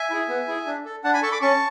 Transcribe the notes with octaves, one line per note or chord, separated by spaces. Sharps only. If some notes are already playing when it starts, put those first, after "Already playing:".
Already playing: E5 G#5
E4 G#4
B3
E4 G#4
D4
A4
D4 F#5 A5
G#5 B5
A4 A5 C#6
B5 D6
C#4 A5 C#6